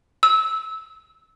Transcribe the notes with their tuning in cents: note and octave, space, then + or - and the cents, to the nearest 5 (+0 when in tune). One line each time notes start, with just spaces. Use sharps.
E6 -20